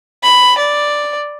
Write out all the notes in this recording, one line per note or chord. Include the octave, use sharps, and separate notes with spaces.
B5
D5